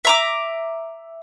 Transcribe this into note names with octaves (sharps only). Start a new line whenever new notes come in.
E5 A#5 D6